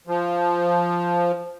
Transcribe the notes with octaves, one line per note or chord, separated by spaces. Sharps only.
F3